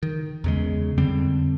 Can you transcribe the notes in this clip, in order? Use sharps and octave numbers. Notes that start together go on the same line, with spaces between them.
D#3
E2 C#3 G#3
F2 D3 G3 C4